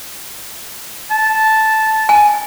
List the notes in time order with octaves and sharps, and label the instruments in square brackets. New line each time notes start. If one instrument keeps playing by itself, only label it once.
[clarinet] A5
[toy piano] G#5